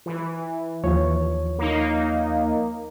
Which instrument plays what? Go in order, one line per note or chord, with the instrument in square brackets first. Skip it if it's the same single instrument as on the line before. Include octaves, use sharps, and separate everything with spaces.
[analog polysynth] E3
[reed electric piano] D#2 F3 C#5
[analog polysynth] A#3 D#4